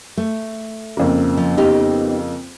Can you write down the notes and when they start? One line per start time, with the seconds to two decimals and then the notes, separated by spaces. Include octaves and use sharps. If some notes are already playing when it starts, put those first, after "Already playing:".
0.17 A3
0.97 F2 C#3 A#3
1.37 F3
1.57 B3 D#4 G4